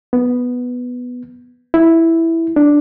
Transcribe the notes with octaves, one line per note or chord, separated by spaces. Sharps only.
B3
E4
D4